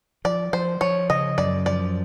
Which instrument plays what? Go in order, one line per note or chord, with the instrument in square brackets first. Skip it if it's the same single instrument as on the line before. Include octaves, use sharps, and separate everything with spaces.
[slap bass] F3 [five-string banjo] D5
[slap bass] F3 [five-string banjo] C5
[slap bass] F3 [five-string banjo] C#5
[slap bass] C#3 [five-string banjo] D#5
[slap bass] F#2 [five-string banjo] D5
[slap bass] F3 [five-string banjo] D5